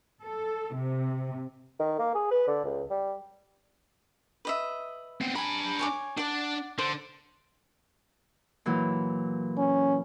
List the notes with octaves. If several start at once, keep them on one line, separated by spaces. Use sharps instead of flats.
A4
C3
D#3
A#3
G#4
B4
D3
C#2
G3
B4 D#5 E5
B3 C4
D4 G#5 A#5 B5
C#5 G#5 D6
D4 D5 F#5
D3 C5
A#2 E3 F#3
C#4